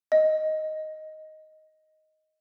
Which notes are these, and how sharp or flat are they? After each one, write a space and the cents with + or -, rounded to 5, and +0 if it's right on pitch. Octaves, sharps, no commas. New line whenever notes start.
D#5 +5